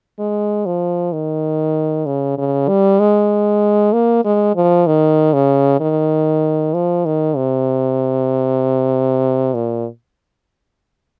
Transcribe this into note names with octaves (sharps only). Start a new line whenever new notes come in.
G#3
F3
D#3
C#3
C#3
G3
G#3
A#3
G#3
F3
D#3
C#3
D#3
F3
D#3
C3
A#2